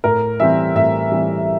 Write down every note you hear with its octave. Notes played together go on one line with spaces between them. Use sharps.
A2 A#4
E3 G3 C4 E5
A2 E5
E3 G3 C4